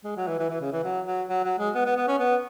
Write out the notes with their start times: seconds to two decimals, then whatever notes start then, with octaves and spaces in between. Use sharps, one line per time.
0.04 G#3
0.17 F#3
0.28 E3
0.39 E3
0.50 E3
0.61 C#3
0.72 E3
0.84 F#3
1.07 F#3
1.29 F#3
1.44 F#3
1.59 G#3
1.75 B3
1.86 B3
1.97 B3
2.08 C#4
2.19 B3